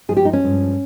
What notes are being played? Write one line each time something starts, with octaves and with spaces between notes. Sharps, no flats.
G2 F3 G#3 G#4
G4
D#4
C#4
G2 F3 G#3